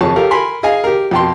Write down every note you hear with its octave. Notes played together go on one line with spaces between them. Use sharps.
F2 G#4 C#5 A5 C#6
F4 G4 A4 A#4 F5
A#4 G#5 B5 C6
G#4 D#5 F5 G#5
G4 A#4
F2 B2 G5 A5 C6